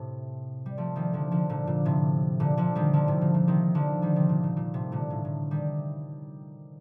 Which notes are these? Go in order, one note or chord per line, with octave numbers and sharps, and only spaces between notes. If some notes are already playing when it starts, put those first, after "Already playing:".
Already playing: A2 C3
G3
F3 A3
D#3 G3
D3 F3
D3 F3
A#2 D3
A#2
A2 C3
A#2 D3
D3 F3
D#3 G3
D3 F3
A2 C3
A#2
A#2
C3 D#3
D3 F3
D#3 G3
C3 D#3
A#2
A#2
A#2
A2 C3
A#2 D3
A2
A2
D#3 G3